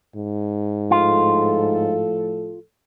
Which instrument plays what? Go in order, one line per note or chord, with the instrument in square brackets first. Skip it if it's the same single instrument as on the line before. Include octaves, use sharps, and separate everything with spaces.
[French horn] G#2
[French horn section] A2 F3 A4 [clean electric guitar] F4